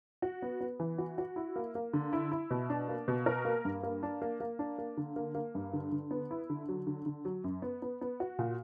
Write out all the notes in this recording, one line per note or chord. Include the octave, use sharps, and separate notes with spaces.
F#4
B3
B3
E3
F#4
F#4
E4
A#3
A#3
D3
E4
E4
B2
D4
A#3
B2
A#4
A#3
G2
A#3
D4
A#3
A#3
D4
A#3
D3
A#3
A#3
G2
D3
D3
B3
E4
D3
F#3
D3
D3
F#3
F#2
B3
B3
B3
F#4
A#2